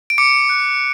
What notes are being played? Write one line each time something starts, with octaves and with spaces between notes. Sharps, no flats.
D7
D6 C#7
F#6